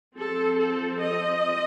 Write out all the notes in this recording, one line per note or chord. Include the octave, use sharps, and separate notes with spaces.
F3 C4 A4
A4
D#5